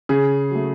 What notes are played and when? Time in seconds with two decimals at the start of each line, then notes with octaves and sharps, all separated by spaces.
0.09 C#3 G#4
0.51 F#3 A3